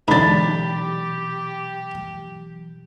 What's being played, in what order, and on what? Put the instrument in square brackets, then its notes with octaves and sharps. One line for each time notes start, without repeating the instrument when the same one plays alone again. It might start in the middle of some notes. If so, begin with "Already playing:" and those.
[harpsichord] G#2 D3 [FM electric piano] B2 E3 F#3 [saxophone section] G4 [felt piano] B5 A6